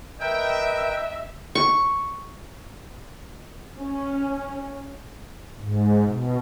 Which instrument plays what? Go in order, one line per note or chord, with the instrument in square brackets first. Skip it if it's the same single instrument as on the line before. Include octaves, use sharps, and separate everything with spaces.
[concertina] A#4 B4 [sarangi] D#5 [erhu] E5 [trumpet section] G5
[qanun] C#6
[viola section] C#4
[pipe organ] G#2
B2